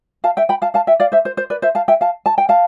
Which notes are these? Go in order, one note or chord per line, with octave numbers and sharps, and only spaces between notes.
F5 A5
E5 G5
G5 B5
F5 A5
F5 A5
E5 G5
D5 F5
C5 E5
C5
C5
B4 D5
C5 E5
F5 A5
E5 G5
F5 A5
A5
G5
F5 A5